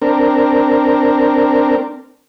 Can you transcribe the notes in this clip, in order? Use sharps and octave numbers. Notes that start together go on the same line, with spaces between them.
C4 D4 A#4